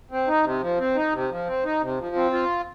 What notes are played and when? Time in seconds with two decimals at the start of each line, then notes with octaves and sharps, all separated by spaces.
0.11 C4
0.28 D#4
0.44 C3
0.61 F3
0.79 C4
0.96 D#4
1.13 C3
1.31 F3
1.47 C4
1.65 D#4
1.82 C3
1.99 F3
2.16 C4
2.33 F4